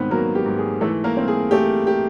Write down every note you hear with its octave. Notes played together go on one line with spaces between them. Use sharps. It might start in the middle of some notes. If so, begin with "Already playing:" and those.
Already playing: G#2 D#3 B3 C4 B4 C5
F#3 A#3 A#4
G4
G#2
G#4
E3 A3 A4
A#3 A#4
C4
G#4
A3 G4
G4